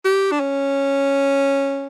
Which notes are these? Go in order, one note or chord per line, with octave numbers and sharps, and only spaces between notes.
G4
D4
C#4